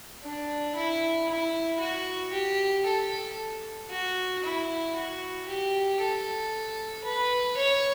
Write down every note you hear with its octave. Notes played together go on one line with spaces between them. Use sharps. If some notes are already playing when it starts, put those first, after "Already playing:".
D4
E4
E4
F#4
G4
A4
F#4
E4
F#4
G4
A4
B4
C#5